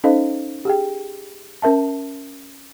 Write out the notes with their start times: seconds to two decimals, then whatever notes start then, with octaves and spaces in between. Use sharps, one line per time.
0.04 C#4 D#4 A4 C5 D#5 F5
0.65 G4 G#4 G5
1.62 C#4 A#4 E5 A5